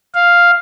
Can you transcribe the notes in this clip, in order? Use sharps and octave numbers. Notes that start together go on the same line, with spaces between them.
F5